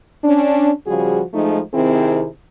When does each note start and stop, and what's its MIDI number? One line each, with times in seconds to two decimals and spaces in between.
0.24 0.71 61
0.24 0.71 62
0.87 1.22 49
0.87 1.22 53
0.87 1.22 55
0.87 1.22 66
0.87 1.22 68
1.33 1.61 53
1.33 1.61 56
1.33 1.61 57
1.33 1.61 63
1.74 2.27 48
1.74 2.27 51
1.74 2.27 60
1.74 2.27 64
1.74 2.27 68